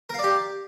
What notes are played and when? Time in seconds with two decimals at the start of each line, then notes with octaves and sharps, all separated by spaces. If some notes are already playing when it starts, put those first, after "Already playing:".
0.09 A#4
0.14 F5
0.19 D5
0.23 G4